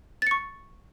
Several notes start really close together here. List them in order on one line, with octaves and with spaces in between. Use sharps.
A6 C#7 C#6